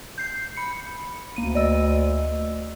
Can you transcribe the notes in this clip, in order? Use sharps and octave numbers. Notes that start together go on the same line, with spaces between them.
G6 C7
B5 C#7
D2 A#3 D#7
D5 D#5 E6